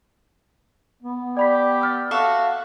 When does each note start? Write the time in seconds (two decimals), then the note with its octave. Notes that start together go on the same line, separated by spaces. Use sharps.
1.03 B3
1.37 G4 D5 B5 B6
1.81 E6 F6 A6
2.11 F#4 A4 E5 F5